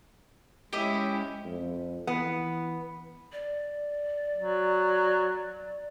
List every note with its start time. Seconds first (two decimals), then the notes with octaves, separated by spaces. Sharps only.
0.73 G#3 C#4 E4 G4 D#5 E5
1.45 F2
2.07 E3 B3
3.32 D5
4.35 F#3